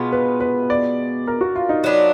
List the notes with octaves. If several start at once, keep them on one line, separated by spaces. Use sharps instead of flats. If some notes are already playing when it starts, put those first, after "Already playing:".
Already playing: B2 G#3 B3 F4
B4
B4
D5
A#4
F#4
F4
D#4
F#3 B3 D4